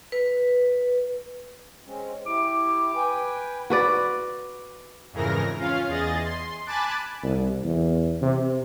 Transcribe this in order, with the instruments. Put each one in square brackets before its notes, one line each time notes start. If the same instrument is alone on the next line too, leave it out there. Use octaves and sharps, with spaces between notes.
[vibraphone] B4
[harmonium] G#3 C4 C#4
[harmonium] E4 G4 [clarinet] D6
[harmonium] B4 G5 G#5
[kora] F#4 B4 D5
[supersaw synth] F2 G#2 C#3 E3 A#4 A#6
C#4 F4 F5
E2 G#4 D#5 A6
C6
G#5 A5 B5 D6 F#6 A6
[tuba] C2
E2
C3